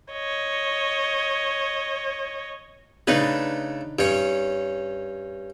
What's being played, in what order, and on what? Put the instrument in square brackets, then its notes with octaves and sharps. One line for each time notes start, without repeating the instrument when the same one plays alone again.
[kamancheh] C#5 D#5
[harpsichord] C#3 A3 [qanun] D4 D#4 B4
[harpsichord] G2 C#4 [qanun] C#5